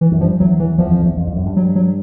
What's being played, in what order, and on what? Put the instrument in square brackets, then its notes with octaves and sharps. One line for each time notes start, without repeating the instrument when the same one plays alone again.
[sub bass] E3
[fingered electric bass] F#2
[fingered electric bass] G2 [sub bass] F3
[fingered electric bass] E2 [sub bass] F#3
[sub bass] E3
[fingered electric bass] E2 [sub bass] F3
[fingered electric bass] F2
E2
F2
F2
F#2
G2
[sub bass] F#3
F#3